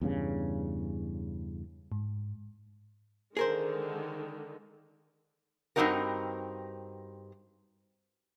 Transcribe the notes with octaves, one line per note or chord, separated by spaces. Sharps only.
E2 G2 C#3
G#2
D3 D#3 G#3 G#4 A#4 C5
G2 D3 C4 D#4 F#4 A#4